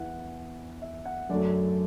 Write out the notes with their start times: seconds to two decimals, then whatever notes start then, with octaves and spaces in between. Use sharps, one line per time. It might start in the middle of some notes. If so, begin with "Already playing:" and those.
Already playing: E2 E3 B3 E5 F#5
0.82 E5
1.05 F#5
1.29 F#2 D3 F#3 A3 D5